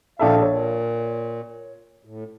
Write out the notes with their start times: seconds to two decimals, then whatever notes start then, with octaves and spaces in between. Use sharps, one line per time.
0.19 A#1 A4 E5 F5
0.42 A#2 C#5
2.05 A2